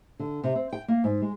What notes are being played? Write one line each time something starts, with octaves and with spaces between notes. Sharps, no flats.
D3
C3
C4
G5
A#3
G#2
G#3